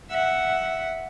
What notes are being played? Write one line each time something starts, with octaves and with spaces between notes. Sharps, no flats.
E5 F#5